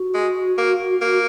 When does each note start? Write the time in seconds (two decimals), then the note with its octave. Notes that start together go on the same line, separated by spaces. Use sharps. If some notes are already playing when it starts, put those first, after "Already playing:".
Already playing: F#4
0.14 G#3
0.58 A#3
1.02 A#3